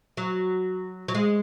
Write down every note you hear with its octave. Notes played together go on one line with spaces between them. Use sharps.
F#3
F#3
G#3